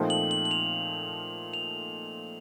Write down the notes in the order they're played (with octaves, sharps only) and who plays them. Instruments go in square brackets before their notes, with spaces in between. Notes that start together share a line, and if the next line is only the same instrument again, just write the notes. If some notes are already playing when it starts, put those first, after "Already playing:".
Already playing: [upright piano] A#2 F3 A3 C4 D#4
[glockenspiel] F#7
F#7
F#7
F7
F7